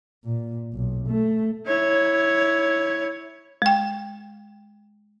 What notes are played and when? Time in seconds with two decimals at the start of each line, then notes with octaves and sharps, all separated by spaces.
0.24 A#2
0.74 B1
1.07 A3
1.67 E4 C#5
3.62 G#3 G5